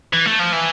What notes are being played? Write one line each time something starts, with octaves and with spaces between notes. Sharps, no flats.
E3
A3
F3
E3